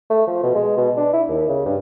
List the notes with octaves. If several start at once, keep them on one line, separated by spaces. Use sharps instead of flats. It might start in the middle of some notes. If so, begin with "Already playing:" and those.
A3
F3
B2
G#3
B2
D4
E4
D#2
C#3
G2